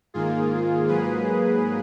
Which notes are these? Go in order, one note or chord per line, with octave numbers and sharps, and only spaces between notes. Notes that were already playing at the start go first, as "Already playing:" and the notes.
G#2 D#3 A#3 F4 G#4
G#2 F#3 A#3 G#4 B4